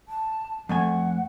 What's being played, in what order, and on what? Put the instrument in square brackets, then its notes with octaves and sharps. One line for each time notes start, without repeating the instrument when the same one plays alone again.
[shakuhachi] A5
[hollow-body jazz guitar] F2 A3 G#5 [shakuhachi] F#5